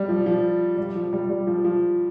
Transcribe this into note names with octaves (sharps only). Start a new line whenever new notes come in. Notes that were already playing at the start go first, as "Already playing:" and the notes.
Already playing: G3
F3
F3
G3
F3
G3
G3
F3
F3